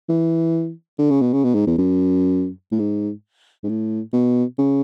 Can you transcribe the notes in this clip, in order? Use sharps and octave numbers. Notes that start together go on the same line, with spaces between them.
E3
D3
C#3
B2
C#3
B2
G#2
E2
F#2
A2
G#2
G#2
A2
B2
C#3